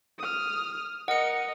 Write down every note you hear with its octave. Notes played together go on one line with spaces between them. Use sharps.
D#6 F6
A#4 D#5 F#5 C#7